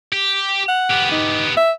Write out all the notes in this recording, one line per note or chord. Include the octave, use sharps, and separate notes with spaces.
G4
F#5
B3 G4
D#4
E5